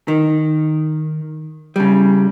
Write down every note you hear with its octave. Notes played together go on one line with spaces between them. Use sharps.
D#3
C#3 G3